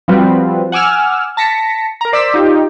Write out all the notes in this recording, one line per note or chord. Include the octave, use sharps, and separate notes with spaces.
F3 G3 C4 F4 F#4 B4
F#5 G#5 D6 E6 F6
A5 A#6 B6 C#7
A#4 A#5
C5 D5 D6 E6 B6
D#4 F4 G4